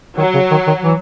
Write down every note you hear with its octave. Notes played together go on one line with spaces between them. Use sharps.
D#3 F#3
C#3
D#3
D#3
E3